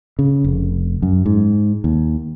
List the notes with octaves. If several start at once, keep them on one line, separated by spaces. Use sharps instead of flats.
C#3
F1
F#2
G#2
D#2